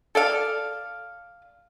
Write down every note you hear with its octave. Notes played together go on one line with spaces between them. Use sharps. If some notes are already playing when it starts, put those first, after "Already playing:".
A4 D5 F5